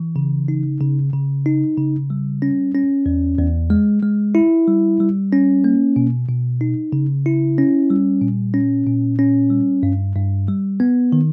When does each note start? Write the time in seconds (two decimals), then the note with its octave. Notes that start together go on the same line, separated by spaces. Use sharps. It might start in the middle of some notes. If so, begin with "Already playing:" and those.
Already playing: E3
0.16 C#3
0.48 D#4
0.81 C#3
1.13 C#3
1.46 D#4
1.78 C#3
2.10 G3
2.42 C#4
2.75 C#4
3.06 E2
3.38 E2
3.70 G#3
4.02 G#3
4.35 E4
4.68 G3
5.00 G3
5.33 C#4
5.64 A#3
5.96 B2
6.28 B2
6.61 D#4
6.92 C#3
7.26 E4
7.58 C#4
7.90 G3
8.21 A#2
8.54 C#4
8.87 A#2
9.19 C#4
9.50 G3
9.83 G2
10.16 G2
10.48 G3
10.80 B3
11.12 D#3